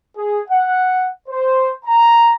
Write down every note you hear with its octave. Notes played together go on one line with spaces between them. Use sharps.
G#4
F#5
C5
A#5